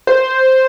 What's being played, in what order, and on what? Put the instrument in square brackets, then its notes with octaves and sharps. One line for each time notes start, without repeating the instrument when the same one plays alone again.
[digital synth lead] C5